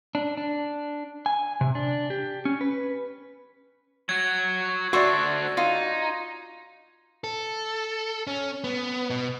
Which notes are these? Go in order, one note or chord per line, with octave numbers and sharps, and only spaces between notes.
D4
D4
G#5
C3
D4
G4
C#4
B4
F#3 F#4 G#6
A3 D4 F#4 C5 D5 E5 C#6
D#4 F4
A4
C#4
B3
B2